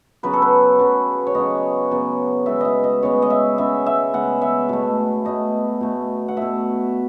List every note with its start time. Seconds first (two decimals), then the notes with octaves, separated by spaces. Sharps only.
0.23 C#3 F#3 B3 B4
0.33 A4
0.42 B4
0.79 C#3 F#3 B3
1.27 C#5
1.35 C#3 F#3 B3 D#5
1.91 C#3 F#3 B3
2.46 C#3 G#3 B3 E5
2.61 D#5 E5
2.84 D#5
3.03 C#3 G#3 B3 C#5
3.22 D#5
3.30 E5
3.58 C#3 G#3 B3 E5
3.86 E5
4.14 C#3 G#3 B3 F#5
4.42 E5
4.69 B2 A3
5.25 B2 A3 D#5
5.81 B2 A3
6.28 F#5
6.37 B2 A3 E5